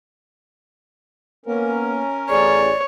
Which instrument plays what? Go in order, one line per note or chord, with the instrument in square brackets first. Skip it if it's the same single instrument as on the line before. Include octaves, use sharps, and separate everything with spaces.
[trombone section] A#3 B3 [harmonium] C#4 A#4
[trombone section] A1 G#4 [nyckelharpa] C#5 [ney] D5